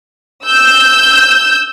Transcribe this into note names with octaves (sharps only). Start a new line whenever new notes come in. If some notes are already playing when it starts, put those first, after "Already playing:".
E6 G6